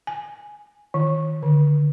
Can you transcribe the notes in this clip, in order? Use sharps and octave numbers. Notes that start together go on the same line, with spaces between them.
G#5
D#3
D3